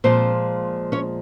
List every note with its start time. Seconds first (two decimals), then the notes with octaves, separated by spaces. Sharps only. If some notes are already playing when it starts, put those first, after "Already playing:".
0.04 A#2 F3 G#3 C4 C5
0.92 C#4 C#5